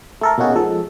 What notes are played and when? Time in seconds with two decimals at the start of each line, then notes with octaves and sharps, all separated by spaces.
0.21 A3 A4 A#4
0.38 B2 A#3 C#4 D#4 F#4 G#4
0.56 F3 G#3 A4